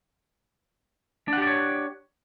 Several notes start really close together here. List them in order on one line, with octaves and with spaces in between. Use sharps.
D4 F#5 G4 D5 C#5